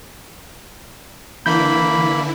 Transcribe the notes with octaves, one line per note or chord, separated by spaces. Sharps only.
D3 E3 A#3 E4 B5 G6